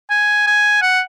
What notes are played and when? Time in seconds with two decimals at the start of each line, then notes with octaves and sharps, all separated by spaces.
0.11 G#5
0.47 G#5
0.82 F#5